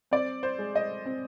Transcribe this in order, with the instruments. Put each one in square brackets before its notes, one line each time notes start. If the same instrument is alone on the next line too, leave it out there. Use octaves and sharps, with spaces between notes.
[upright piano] C4 D5
C5
G#3
D#5
C4